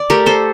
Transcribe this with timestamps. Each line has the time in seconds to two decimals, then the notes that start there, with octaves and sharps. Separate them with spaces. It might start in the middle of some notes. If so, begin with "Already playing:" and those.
Already playing: D5
0.10 A3 G4 A#4
0.26 A4 C5